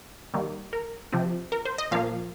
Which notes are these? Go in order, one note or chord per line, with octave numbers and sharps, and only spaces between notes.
D#3 G3 A#3
A#4
C3 F3 C4
A#4
C5
D#5
A#2 F3 A#3 F5